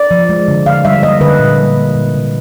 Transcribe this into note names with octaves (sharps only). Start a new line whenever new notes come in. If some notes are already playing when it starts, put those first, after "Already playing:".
Already playing: D5
F3
G#3
D3
D3 F5
G3 E5
A#3 D#5
D3 B4
A#2
G3
A#3
A#2
C3